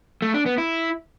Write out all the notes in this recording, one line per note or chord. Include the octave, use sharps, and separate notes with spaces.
A3
D4
B3
E4